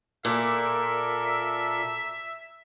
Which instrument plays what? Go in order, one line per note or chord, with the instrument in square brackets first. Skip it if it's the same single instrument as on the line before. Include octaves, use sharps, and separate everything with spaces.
[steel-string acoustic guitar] A#2 [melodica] A4 A#4 D5 [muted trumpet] E5